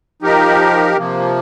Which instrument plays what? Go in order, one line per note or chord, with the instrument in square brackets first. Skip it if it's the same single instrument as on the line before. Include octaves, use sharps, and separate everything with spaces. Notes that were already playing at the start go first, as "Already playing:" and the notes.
[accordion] F3 D#4 G4 A#4
C3 F3 A#3